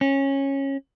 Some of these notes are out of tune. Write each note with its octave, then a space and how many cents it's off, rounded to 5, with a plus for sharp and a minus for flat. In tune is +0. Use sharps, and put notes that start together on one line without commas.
C#4 -15